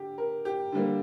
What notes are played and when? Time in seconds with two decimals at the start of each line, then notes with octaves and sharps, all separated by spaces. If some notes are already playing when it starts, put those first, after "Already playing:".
Already playing: D3 G4
0.18 A#4
0.45 G4
0.72 D3 G3 A#3